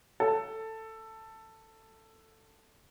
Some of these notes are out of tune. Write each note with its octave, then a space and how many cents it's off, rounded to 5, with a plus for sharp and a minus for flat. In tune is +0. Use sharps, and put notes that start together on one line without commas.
A4 +10